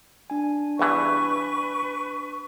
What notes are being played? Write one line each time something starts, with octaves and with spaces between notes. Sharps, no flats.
D4 G#5
E2 G2 E3 B4 C#6